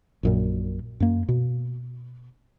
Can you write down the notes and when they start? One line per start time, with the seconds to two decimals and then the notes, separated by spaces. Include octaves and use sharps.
0.23 A#1 F#2 A#2
1.00 F#2 A#3
1.29 B2